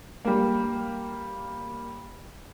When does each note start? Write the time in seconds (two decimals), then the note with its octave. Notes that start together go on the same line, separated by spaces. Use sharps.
0.25 G3 A#3